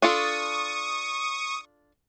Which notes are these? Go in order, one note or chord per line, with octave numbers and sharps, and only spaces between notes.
D4 F4 A4 C#6 D#6